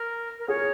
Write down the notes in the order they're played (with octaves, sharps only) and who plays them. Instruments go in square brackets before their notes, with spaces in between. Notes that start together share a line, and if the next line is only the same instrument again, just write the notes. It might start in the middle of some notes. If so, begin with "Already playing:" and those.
Already playing: [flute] A#4
A#4
[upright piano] G#4 [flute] C#5